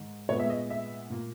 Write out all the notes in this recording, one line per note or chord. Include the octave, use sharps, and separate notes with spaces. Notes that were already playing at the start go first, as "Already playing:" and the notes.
Already playing: G#2 D#3
A#2 G#3 B3 C#5
E5
D#5
E5
A#2 A#3